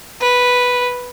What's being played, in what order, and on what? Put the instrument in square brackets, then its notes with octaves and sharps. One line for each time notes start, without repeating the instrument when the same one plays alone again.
[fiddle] B4